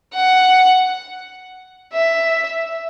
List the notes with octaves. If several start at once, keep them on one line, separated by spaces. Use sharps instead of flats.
F#5
E5